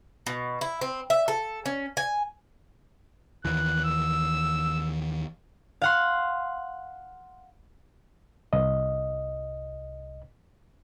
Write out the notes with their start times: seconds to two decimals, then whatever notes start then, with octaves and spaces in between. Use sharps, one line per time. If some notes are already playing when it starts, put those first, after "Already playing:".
0.27 B2
0.61 E4
0.81 C4
1.10 E5
1.28 A4
1.66 C#4
1.97 G#5
3.45 D#2 E3 F#6
3.85 E6
5.82 F5 F#5 C6
8.53 C2 D#5